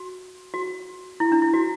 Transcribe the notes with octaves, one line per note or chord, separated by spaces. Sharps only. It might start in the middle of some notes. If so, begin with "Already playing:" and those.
Already playing: F#4
F#4
E4
D4
E4
F#4